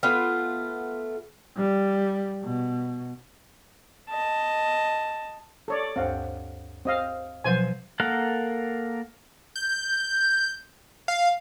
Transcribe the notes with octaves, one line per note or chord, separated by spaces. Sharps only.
A3 B3 F4
G3
B2
D#5 A5
A4 C#5 D5
D2 G2 C4 F5 F#5
C4 D#5 F5
B2 F3 F#3 C5 G#5
A#3 A4 A#4 F5 F#5
G6
F5